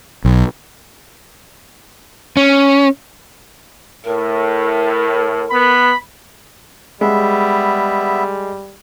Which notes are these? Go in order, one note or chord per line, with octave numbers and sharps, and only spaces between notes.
B1
C#4
A2 A#4
B3 B5
G3 G#3 B3 E5